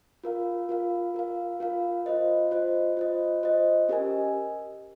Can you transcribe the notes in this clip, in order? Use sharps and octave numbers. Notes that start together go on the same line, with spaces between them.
F4 A#4 F5
F4 A#4 F5
F4 A#4 F5
F4 A#4 F5
F4 C5 D#5
F4 C5 D#5
F4 C5 D#5
F4 C5 D#5
C#4 G4 A#4 D#5 G#5